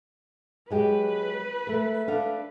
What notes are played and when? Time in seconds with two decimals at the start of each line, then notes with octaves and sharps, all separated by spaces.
0.70 F#3 G#3 G4 B4
1.67 A3 A#4
2.08 D4 A4 F5